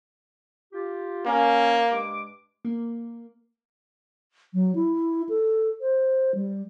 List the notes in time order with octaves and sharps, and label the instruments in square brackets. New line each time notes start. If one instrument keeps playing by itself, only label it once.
[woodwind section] F4 G4
[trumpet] A#3 [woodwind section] C#4
[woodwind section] G2 G#3 D6
[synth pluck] A#3
[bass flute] F#3
E4
A4
C5
G3